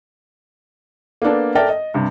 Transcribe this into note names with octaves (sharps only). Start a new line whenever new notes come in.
A#3 B3 D4 A4
A4 A#4 D5 E5 G5 A5
D#5
G2 C3